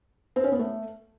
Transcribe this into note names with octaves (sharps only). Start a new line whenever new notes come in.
C4
C#4
B3
A3